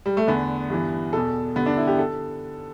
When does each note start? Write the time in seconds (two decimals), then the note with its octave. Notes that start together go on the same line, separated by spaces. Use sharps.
0.06 G3
0.17 A3
0.27 E2 D3 B3
0.70 G2 E3
1.13 E2 B2 A4
1.56 G2 D3 B3
1.66 D4
1.77 E4
1.87 G4
1.99 A4